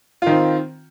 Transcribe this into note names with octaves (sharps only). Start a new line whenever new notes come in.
D#3 C4 F4